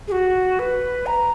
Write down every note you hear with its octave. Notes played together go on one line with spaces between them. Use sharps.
G#4
F#4
B4
A#5